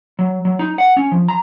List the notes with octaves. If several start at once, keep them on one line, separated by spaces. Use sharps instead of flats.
F#3
F#3
D#4
F#5
C#4
F3
A#5